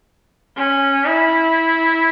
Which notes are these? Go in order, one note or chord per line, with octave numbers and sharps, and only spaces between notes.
C#4
E4